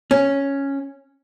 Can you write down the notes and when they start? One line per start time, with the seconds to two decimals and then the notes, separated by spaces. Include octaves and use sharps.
0.11 C#4